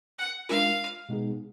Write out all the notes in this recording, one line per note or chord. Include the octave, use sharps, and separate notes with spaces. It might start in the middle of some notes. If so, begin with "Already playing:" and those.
F#5
G#3 D4 F4 A#4 F5
B2 G#3 B3 D#4 G#4